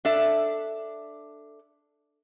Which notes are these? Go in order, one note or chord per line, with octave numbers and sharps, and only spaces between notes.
D4 A4 E5